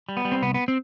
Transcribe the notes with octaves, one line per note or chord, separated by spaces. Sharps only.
G3
B3
G3
C4
C2 B3
B3
C4